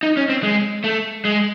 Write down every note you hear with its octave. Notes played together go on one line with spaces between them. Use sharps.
D#4
C#4
C4
G#3
A3
G#3